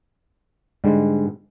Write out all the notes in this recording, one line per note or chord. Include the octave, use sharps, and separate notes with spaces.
G#2 D3 G3 G#3